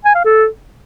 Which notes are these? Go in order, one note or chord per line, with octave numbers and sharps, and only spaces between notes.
G#5
F5
A4